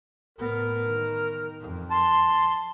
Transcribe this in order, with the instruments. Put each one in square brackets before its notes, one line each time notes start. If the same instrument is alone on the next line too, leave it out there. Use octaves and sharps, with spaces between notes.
[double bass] A2 B3 [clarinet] A#4
[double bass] D#3
F2
[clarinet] A5 [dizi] C6